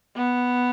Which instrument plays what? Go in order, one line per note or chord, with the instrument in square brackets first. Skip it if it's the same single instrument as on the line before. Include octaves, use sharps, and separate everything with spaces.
[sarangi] B3